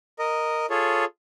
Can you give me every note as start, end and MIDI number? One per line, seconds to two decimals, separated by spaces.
0.19 0.66 70
0.19 0.66 75
0.70 1.05 65
0.70 1.05 68
0.70 1.05 69
0.70 1.05 73